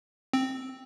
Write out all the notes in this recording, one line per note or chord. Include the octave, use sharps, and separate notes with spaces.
C4